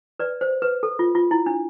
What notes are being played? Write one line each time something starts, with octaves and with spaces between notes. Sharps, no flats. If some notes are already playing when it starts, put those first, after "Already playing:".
B4 D5
C5
B4
A4
F4
F4
E4
D4